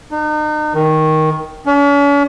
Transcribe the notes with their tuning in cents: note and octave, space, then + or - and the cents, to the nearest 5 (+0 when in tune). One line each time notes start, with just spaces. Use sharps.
D#4 -40
D#3 +10
C#4 +45